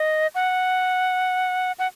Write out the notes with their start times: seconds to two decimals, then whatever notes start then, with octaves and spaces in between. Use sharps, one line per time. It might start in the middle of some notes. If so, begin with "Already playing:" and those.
Already playing: D#5
0.35 F#5
1.79 F#5